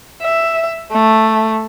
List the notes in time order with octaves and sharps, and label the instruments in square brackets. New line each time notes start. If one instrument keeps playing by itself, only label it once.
[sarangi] E5
A3